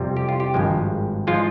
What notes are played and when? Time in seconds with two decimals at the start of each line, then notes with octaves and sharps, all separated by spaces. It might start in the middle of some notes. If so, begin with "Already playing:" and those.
Already playing: F2 C3 G3
0.17 G4
0.29 F4
0.40 G4
0.54 G#1 G2 F3 G#3
1.27 F3 G#3 F4